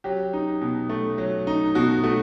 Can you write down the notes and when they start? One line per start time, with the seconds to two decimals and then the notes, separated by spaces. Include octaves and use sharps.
0.04 F#3 G4
0.33 D#4
0.61 B2
0.89 A3
1.18 F#3
1.47 D#4
1.75 B2 F#4
2.03 A3 F#4